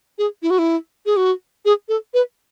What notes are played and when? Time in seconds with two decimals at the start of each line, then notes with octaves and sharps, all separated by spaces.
0.18 G#4
0.42 E4
0.50 F#4
0.59 E4
1.06 G#4
1.17 F#4
1.65 G#4
1.89 A4
2.14 B4